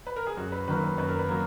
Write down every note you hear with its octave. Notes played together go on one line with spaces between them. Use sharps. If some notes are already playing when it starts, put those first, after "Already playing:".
B4
A#4
G#4
F#2 F#4
B4
D#3 F#3 A#3 B4
B4
F#2 B4
A#4
B4
F#3 A#3